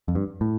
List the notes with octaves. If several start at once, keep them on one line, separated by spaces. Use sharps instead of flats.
F2
G2
A2